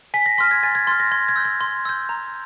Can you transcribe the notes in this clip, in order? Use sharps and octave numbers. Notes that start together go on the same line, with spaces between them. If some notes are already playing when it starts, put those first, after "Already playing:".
G#5 B6
A#6
C6 F6 B6
G#6
G#5 A6
G#6
C6 F6 A6
A#6
C6 G#6
G#6
E6 G6
G#6
C6
E6 G6
A#5